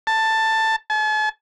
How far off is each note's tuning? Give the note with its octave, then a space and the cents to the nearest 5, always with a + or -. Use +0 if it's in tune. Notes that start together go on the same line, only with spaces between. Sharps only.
A5 +10
A5 -45